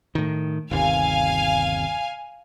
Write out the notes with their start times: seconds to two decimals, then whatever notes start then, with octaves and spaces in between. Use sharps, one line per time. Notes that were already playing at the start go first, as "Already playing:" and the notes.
0.15 A2 D#3
0.71 G1 D#2 C3 F5 G#5